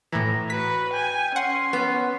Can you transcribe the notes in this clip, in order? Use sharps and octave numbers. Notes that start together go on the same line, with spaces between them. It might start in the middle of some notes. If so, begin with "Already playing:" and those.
A2 E3 A#5
F#4 B4 B6
G5 G#5
C#4 F#5 C6
B3